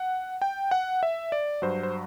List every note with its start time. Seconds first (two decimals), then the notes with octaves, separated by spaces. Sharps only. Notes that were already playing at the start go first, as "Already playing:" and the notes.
Already playing: F#5
0.42 G5
0.71 F#5
1.03 E5
1.32 D5
1.62 G2 F#3 C5
1.83 C5